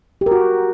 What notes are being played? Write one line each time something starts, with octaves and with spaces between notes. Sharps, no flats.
G4
A#4
F#4